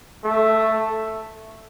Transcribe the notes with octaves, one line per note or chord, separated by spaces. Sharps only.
A3